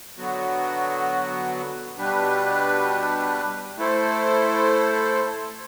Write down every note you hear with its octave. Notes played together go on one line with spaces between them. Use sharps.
D3 F#3 B3 F#4
B2 G3 D4 G4 B4
A3 E4 A4 C5